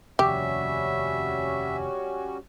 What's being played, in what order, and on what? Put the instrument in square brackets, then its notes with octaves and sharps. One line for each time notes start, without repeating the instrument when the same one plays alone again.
[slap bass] F1 D#2 [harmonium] G3 C#4 F#4 [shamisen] G4 [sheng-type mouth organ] E5